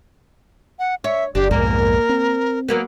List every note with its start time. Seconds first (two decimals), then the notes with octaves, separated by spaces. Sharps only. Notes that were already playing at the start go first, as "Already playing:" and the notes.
0.79 F#5
1.04 C#5 E5
1.35 F#1 D4 G4
1.51 B1 F2 G#2 A#3 A#4
2.09 C4
2.69 F#3 A#3 B3